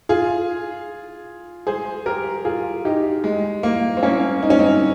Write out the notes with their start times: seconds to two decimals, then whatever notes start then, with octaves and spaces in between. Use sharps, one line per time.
0.09 F4 G#4
1.67 G#4 C5
2.06 G4 A#4
2.45 F4 G#4
2.85 D#4 G4
3.24 G#3
3.63 A#3
3.97 C4
4.03 A#3 C#4
4.43 D#4
4.50 C#4
4.59 C4 D#4